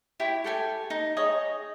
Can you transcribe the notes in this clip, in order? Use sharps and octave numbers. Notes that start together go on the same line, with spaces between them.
E4 G4 C#5 G5
G4 A4 G5 G#5
D#4
G#4 C#5 D#5